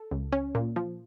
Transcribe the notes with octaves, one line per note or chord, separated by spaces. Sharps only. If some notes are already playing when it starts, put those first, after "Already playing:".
Already playing: A4
C#2
C#4
A#2
F3